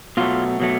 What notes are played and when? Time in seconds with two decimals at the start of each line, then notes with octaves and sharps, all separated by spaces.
0.17 B2 F#3 A3 F4
0.60 B2 F#3 A3